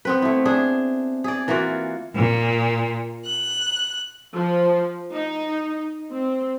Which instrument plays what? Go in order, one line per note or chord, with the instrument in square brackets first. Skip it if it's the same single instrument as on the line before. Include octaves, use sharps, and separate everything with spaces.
[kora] B3 C4 B4
A3 E4
D4 G#4
G#4 D5
E3 A#3 F4 F#4
[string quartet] A#2
F#6
[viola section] F3
D#4
C4